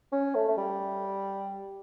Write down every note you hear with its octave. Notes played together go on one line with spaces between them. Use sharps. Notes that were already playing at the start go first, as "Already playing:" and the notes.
C#4
A3
A3
G3